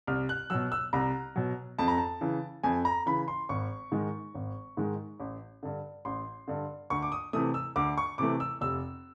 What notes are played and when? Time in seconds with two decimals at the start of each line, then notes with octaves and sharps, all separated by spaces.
0.07 C2 F6
0.29 F#6
0.50 B2 F#3 E6
0.72 E6
0.93 C2 A#5
1.36 B2 F#3
1.79 F2 A5
1.88 A#5
1.98 A5
2.21 C#3 E3
2.63 F2 G#5
2.85 A#5
3.06 C#3 E3 B5
3.28 C6
3.49 G#1 C#6
3.91 G#2 D#3 G#3
4.35 G#1
4.77 G#2 D#3 G#3
5.20 A1
5.63 G2 D3
6.05 A1 C6
6.48 G2 D3
6.90 D2 C#6
7.02 D6
7.12 D#6
7.33 C3 E3 A3 D#6
7.54 E6
7.76 D2 D6
7.98 C#6
8.18 C3 E3 A3 D6
8.40 E6
8.61 F1 E6